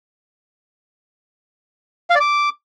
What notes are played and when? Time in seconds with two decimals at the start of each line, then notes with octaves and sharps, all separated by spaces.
2.10 F5
2.15 D5
2.20 D6